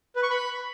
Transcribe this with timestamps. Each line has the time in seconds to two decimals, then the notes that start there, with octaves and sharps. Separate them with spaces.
0.16 B4
0.23 C#6
0.30 B5